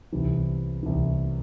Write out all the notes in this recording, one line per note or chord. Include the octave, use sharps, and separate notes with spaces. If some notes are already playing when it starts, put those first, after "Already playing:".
C2 C3 E3
C2 C3 E3